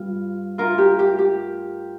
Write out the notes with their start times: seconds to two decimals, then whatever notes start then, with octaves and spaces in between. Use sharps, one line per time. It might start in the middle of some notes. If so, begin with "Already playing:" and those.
Already playing: G2 G3 F4
0.58 F4 A#4
0.78 G4
0.99 G4
1.19 G4